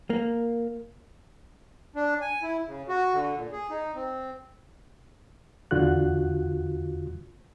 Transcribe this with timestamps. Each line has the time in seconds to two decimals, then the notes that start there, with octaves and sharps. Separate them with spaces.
0.10 A#3
1.96 D4
2.21 G#5
2.42 E4
2.67 C#3
2.89 F#4
3.14 D3
3.36 A#2
3.52 G#4
3.70 D#4
3.95 C4
5.71 E2 D3 F4 F#4 F#6